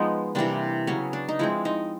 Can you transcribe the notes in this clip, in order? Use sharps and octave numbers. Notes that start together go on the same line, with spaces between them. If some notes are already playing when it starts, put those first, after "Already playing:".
Already playing: F3 G#3 B3 D#4
C3 E3 G3 A#3 D4
C#3 F#3 B3 C#4
D4
D#4
F3 G#3 C4 E4
D#4